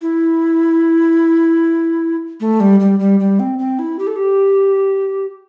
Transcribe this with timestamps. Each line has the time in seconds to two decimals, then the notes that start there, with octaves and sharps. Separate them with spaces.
0.02 E4
2.40 A3
2.60 G3
2.80 G3
2.99 G3
3.20 G3
3.40 C4
3.59 C4
3.79 E4
3.99 G4
4.07 A4
4.16 G4